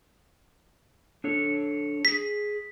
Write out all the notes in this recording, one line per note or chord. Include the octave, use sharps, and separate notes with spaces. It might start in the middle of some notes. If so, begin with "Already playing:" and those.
D4 A4 C#5
G#4 B6